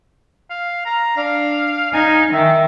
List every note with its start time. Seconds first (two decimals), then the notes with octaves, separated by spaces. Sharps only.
0.50 F5
0.85 A#5
1.17 D4 F5
1.93 D#4 G#5
2.33 D#3 E5